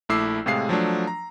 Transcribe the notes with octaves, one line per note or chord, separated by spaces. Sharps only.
A#1 A3 E4 D6 E6 C7
A2 C3 G#3 G#4 F5 C7
F3 F#3 A3 D4
A#5